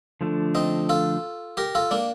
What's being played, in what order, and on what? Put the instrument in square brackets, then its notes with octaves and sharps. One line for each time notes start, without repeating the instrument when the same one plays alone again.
[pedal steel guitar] D3 F3 A3 D4
[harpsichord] C4 D#4
F4 A4
G4 A#4
F4 A4
A#3 D4